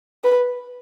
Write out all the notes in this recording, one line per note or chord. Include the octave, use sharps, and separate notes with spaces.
B4